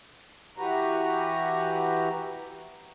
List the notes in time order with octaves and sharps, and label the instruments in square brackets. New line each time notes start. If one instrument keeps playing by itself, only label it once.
[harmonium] E3 F#4 G4 B4 A#5